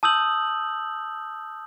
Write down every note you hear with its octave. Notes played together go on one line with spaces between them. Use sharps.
A5 D#6 E6 G6 F#7